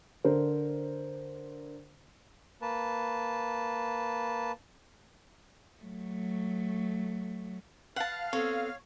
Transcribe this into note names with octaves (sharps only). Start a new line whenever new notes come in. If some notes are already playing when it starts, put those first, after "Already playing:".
D3 A#4 C5
A#3 B4 A5
F#3 A3
B4 F5 F#5 A5
B3 C4 A4 C#5